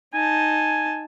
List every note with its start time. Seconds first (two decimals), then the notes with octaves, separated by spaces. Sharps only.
0.14 D#4 G#5 A5